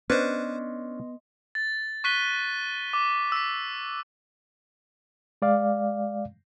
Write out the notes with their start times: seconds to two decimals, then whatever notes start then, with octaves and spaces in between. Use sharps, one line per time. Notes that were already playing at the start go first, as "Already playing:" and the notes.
0.10 B3 C#4 D4 B4 C5 D#5 C6
1.55 A6
2.04 C#6 F#6 B6 D#7 G7
2.93 D6
3.32 E6 B6
5.42 G#3 D5 F5